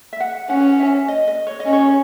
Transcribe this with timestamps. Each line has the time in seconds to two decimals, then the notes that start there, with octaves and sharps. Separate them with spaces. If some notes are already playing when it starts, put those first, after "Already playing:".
0.13 E5
0.20 F#5
0.50 C#4 F#5
0.79 E5
1.08 D#5
1.28 D#5
1.47 C#5
1.60 D#5
1.66 C#4
1.73 C#5